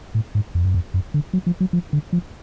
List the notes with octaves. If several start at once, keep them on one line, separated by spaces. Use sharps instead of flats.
A2
G#2
F2
F#2
F2
F#2
D3
F#3
F3
F#3
F3
D3
F3